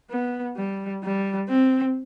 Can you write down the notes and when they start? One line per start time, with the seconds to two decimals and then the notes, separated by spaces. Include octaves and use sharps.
0.10 B3
0.57 G3
1.04 G3
1.49 C4